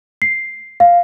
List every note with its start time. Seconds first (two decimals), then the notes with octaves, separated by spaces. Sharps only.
0.22 C7
0.80 F5